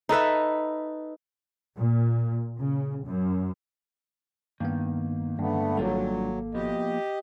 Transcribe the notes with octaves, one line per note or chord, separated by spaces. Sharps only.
D#4 A4 B4 E5
A#2
C#3
F#2
G2 D#3 A#3 B3
G2 D3 A3 B3
G#1 F#3 G3 D4 F4 A4
F3 B3 F#4 G4 D#5